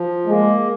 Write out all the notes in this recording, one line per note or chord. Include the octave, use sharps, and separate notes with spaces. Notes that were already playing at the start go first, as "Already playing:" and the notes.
Already playing: F3
G#3 A#3